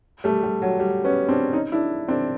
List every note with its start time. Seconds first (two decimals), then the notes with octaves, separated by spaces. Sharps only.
0.24 G3 A3
0.43 G3
0.62 F#3
0.79 G3
1.05 B3 C#4
1.28 C4 D4
1.53 C#4 D#4
1.72 D4 E4
2.08 C4 D4